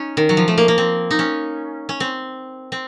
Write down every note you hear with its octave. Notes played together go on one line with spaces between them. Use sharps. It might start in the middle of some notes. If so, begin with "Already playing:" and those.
Already playing: C#4 D#4
D#3
F#3
F3
A3
A#3
A#3
C4
D#4
C#4
C#4
C4
C4